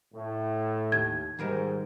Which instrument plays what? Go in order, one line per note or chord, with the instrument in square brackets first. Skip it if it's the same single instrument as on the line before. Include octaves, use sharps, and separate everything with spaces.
[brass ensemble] A2
[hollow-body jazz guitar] D#2 D#3 [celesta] G#6
[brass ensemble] G#2 [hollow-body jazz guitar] D#3 G3 A#4